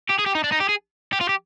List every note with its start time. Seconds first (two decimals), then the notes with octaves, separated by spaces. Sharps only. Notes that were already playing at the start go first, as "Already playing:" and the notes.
0.09 G4
0.18 G#4
0.26 G4
0.35 D#4
0.44 D4
0.52 D#4
0.60 G4
0.69 G#4
1.13 G4
1.21 F4
1.29 G4